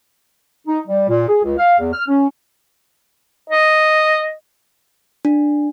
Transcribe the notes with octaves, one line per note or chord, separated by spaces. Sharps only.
D#4
G3
A#2
G#4
C#2
F5
E2
F6
C#4
D#5
D4